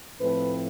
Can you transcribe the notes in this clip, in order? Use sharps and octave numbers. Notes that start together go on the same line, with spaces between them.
A2 F3 A3 C4 B4